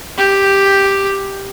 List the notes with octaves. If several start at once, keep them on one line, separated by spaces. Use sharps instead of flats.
G4